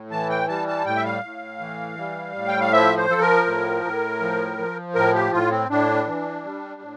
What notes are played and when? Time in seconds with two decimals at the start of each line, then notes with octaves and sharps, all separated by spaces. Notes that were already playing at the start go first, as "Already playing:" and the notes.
Already playing: A2
0.11 E3 A5
0.30 G5
0.49 G3 A5
0.68 A5
0.85 A2 G5
0.96 E5
1.05 F5
1.24 A2
1.60 E3
1.98 G3
2.35 A2
2.48 G5
2.60 F5
2.72 F3 E5
2.97 C5
3.09 F3 A4
3.21 A#4
3.46 A2
3.84 A2
4.21 F3
4.59 F3
4.95 A2 A#4
5.15 G4
5.32 A2 F4
5.51 C4
5.69 A2 D4
6.07 E3
6.44 G3
6.81 A2